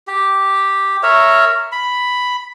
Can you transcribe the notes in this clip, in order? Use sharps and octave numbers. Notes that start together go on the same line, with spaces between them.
G4
A#4 C#5 E5
B5